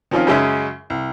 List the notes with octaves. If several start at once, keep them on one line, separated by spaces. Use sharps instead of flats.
D#3 F3 C4 C#4 F4
F#2 C#3 G#3 C#4 E5
C2